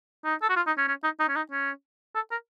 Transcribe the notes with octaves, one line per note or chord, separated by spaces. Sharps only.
D#4
A4
F#4
F4
D#4
C#4
C#4
D#4
D#4
C#4
D#4
C#4
A4
A#4